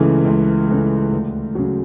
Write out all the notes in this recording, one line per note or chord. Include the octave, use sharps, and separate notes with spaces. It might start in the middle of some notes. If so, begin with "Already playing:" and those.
Already playing: C#2 C#3 E3 A3
C#2
C#3 E3 A3
D2
C#3 F#3